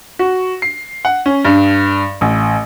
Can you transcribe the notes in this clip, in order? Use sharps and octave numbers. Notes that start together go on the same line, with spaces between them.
F#4
C7
F#5
C#4
G2
A1